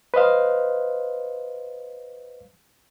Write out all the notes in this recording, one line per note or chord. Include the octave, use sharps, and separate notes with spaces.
B4 C5 D#5 F5